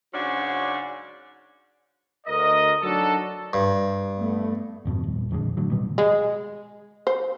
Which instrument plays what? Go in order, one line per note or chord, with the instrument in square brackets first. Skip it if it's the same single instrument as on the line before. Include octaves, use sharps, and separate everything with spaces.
[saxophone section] G#2 C#3 F#3 C#4 D4 F#4
[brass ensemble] D2 A#4 D#5
F#3 D4 D#4 F#4 A4
[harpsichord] G2
[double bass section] A3 B3
[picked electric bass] G#1 F2 B2
D#1
A#1 F2 D3 G#3
A2 D3 F#3
B2 D#3 G3 B3
[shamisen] G#3
C5